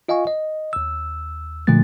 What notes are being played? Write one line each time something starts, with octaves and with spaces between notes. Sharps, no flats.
F4 D#5 F5 G#5 C#6
D#5
D#2 E6
A#2 D3 F3 A3 A6